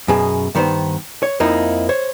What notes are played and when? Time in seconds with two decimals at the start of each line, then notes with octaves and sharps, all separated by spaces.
0.08 F#2 B2 G#4
0.55 G2 D#3 B3 B4 C5
1.23 C#5
1.40 F2 F3 A#3 D#4 E4
1.89 C5 C#5